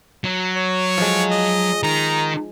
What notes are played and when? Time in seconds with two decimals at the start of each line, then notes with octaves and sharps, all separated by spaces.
0.24 F#3
0.57 C#5
0.98 F3 G#3
1.31 D#5
1.83 D#3 A#5